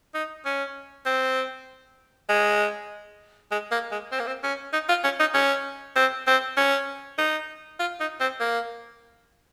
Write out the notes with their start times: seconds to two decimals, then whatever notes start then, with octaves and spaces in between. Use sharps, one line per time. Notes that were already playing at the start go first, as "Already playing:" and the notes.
0.14 D#4
0.45 C#4
1.06 C4
2.29 G#3
3.51 G#3
3.71 A#3
3.91 G#3
4.12 C4
4.20 A#3
4.27 C4
4.44 C#4
4.73 D#4
4.89 F4
5.04 C#4
5.20 D#4
5.34 C#4
5.96 C4
6.27 C4
6.57 C#4
7.18 D#4
7.80 F4
8.00 D#4
8.20 C4
8.40 A#3